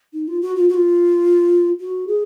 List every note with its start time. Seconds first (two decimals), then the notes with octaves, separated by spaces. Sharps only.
0.14 D#4
0.28 F4
0.42 F#4
0.56 F4
0.69 F#4
0.74 F4
1.80 F#4
2.07 G#4